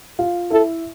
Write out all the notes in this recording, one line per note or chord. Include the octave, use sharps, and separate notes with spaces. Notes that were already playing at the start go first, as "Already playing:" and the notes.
F4 F5
E4 A4 E5